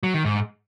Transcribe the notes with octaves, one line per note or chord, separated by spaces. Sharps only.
F#3
D#3
G#2